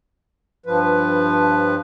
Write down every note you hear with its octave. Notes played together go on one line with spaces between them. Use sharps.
G2 F3 B4